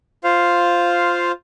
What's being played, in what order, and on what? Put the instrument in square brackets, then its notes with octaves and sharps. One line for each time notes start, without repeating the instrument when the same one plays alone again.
[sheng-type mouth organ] F4 C5 F5